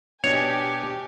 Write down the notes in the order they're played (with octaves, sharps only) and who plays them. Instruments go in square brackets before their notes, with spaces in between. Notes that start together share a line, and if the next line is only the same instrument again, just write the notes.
[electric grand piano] B2 D4 D#5 [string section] G4 G#5 [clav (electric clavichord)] C#5